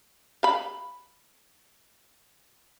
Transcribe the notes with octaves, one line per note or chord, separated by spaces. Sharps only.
F5 B5